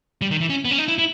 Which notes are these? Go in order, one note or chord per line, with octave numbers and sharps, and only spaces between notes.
G3
D#3
E3
C#4
B3
C#4
D#4
E4
E4